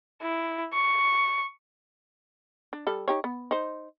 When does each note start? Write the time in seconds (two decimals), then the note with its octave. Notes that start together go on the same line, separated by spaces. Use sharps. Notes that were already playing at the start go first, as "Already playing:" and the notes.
0.21 E4
0.73 C#6
2.73 D4
2.87 G3 A4
3.08 D#4 G4 C#5
3.24 B3
3.51 D#4 C5